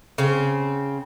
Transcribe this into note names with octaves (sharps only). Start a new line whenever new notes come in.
C#3 C4